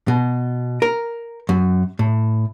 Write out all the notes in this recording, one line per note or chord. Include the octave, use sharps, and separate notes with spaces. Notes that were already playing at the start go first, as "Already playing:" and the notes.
B2
A#4
F#2
A2